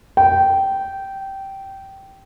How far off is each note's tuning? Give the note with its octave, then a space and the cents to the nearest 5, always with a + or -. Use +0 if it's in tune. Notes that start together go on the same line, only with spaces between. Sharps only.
G5 -15